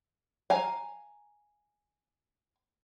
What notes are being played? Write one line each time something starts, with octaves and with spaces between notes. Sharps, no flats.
F5 G#5 A#5